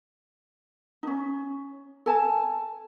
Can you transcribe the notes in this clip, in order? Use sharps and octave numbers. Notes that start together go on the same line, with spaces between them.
C#4 D#4
A4 G#5 A5